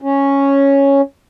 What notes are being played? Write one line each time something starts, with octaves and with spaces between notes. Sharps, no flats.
C#4